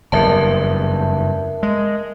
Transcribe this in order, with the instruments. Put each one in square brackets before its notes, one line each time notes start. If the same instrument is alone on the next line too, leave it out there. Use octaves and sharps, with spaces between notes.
[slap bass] F#1 E2 G2 [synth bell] A#4 E5 A5
[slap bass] G#3